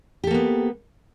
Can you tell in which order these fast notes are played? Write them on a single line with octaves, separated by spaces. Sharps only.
G4 A4 A#3 B3